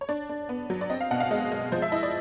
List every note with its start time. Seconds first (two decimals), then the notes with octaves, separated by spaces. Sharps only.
0.01 C#5
0.09 D4 D5
0.29 D4
0.49 B3
0.70 F#3
0.81 D5
0.90 C4 D#5
1.01 F5
1.11 B2 F#5
1.20 F5
1.31 G#3 D#5
1.52 G#3
1.72 F3 C5
1.82 E5
1.92 E4 D#5
2.03 D5